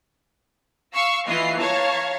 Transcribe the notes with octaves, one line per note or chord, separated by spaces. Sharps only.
F5 C#6 E6
E3 F4 D#5 C7
C#5 F5 A5 A#5